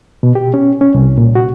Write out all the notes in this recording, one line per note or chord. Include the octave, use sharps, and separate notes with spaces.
B2
G4
C#4
C#4
C2
A#2
F#4